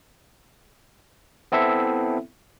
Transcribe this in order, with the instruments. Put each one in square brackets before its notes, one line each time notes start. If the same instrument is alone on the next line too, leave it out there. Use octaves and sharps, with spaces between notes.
[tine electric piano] B3 C4 E4 A4 E5